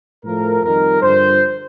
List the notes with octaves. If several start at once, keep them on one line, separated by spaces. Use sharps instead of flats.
A2 F3 A3 A#4
F2 D#3 G3 A#4
G2 D3 F3 C5